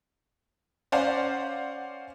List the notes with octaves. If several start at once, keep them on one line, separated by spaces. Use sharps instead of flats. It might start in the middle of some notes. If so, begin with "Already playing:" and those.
C#4 C5 D5 F5 F#5